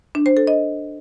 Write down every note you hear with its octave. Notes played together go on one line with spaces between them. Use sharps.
D4
C5
A4
D#5